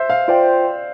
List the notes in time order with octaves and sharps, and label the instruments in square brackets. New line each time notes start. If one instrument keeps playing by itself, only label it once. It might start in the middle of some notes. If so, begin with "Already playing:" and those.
Already playing: [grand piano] C5 E5
F5
[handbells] F4 C5 G5 [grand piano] D5